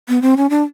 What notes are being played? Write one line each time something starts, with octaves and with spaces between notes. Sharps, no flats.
B3
C4
C#4
D4